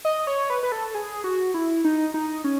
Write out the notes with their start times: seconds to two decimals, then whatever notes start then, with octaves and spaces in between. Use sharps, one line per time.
0.05 D#5
0.27 C#5
0.50 B4
0.63 B4
0.72 A4
0.95 G#4
1.24 F#4
1.54 E4
1.84 D#4
2.14 D#4
2.44 C#4